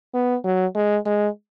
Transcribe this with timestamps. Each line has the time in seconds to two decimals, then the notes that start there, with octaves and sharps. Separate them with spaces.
0.14 B3
0.44 F#3
0.75 G#3
1.06 G#3